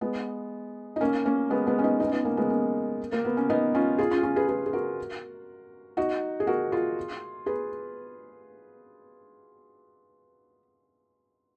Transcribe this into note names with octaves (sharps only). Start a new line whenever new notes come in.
G#3 B3
D#4
A#3 C#4
A#3 C#4
G#3 B3
G#3 B3
C#4
B3 D#4
B3 D#4
C#4
B3 D#4
A#3 C#4
G#3 B3
A#3 C#4
A#3
B3
C#4
B3 D#4
C#4 F4
F4 G#4
C#4 F4
C#4 F4
G#4 B4
G#4 B4
G#4
F#4 A#4
D#4 F#4
G#4
F#4 A#4
F4 G#4
G#4 B4